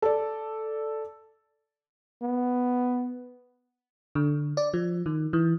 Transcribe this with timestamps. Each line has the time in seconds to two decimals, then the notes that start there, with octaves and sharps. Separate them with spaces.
0.02 A4 D5
2.22 B3
4.15 D3
4.57 D5
4.74 F3
5.06 D#3
5.33 E3